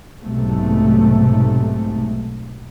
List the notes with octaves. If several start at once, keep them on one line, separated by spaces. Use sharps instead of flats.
B1 G#2 C3 A3